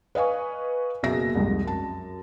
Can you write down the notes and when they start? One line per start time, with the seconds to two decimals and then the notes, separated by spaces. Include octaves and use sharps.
0.15 B4 D#5 F5 G#5 C#6
1.03 F#1 B2 A#3 G#4 E5 A#6
1.35 C2 F2 G#2
1.64 F#2 A5